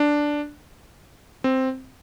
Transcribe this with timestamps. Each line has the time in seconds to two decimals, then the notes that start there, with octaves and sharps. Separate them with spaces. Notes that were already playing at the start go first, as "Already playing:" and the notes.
Already playing: D4
1.44 C4